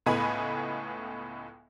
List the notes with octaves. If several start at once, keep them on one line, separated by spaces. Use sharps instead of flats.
C#2 A2 B3 D#5 G#5 B5